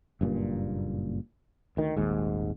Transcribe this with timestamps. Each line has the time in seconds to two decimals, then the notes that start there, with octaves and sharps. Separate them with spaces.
0.21 F#1 G2 A#2
1.77 D2 D#3
1.96 D#1 G#1 D#2 G#2